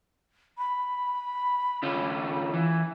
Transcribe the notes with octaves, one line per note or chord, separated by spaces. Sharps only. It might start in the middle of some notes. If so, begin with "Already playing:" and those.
B5
D3 C#4 F4
E3